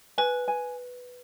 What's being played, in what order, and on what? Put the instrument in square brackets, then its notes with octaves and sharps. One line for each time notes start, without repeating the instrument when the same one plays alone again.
[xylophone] B4 [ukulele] G#5
[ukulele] G#5